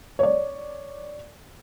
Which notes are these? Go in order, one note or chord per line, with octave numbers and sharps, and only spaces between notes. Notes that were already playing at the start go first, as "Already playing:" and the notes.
C#5 D5